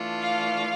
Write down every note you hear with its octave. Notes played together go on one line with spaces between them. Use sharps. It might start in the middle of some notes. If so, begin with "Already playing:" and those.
Already playing: E3 A3 D4 F4
F5